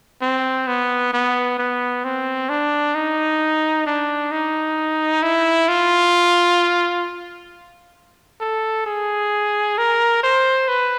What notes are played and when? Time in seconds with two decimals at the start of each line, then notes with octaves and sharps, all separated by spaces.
0.22 C4
0.67 B3
1.13 B3
1.58 B3
2.04 C4
2.49 D4
2.95 D#4
3.86 D4
4.31 D#4
5.23 E4
5.68 F4
8.41 A4
8.86 G#4
9.78 A#4
10.23 C5
10.68 B4